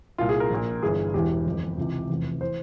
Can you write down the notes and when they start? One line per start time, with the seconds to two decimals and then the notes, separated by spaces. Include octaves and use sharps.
0.18 C2 A#2 F4
0.29 G#4
0.40 A#4
0.50 A#1 A#2
0.82 G1 G2 E3 G#4
1.14 E1 E2 E3 G4
1.46 G1 F2 E3
1.78 C#2 C3 E3
2.10 F1 E2 C3 E3
2.41 E3 C5